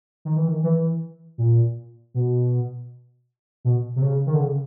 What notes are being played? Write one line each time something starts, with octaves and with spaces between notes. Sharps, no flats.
D#3
E3
D#3
E3
A#2
B2
B2
C3
C#3
D#3
D3
C#3